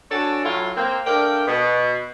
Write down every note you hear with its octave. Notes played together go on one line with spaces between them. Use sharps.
D4 F#4 A4 C#5 G#5 A5
A2 F#3 E4 F4
A#3 C4
A3 D4 A#4 D5 F5 G5
B2